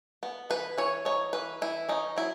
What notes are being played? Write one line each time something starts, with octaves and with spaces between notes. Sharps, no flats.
B3
E3 B4
E3 C#5
D#4 C#5
E3 B4
E3 E4
C#4 D#4
F#3 E4